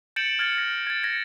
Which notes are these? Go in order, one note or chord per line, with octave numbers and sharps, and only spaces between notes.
G6 A6 C#7 D7 E7 F#7
F6 G#6 A6 C#7
A#6
G#6 A6
G#6 A#6 C#7